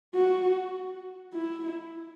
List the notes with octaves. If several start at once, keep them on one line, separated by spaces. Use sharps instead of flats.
F#4
E4